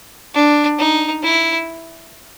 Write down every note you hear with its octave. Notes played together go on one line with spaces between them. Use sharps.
D4
D#4
E4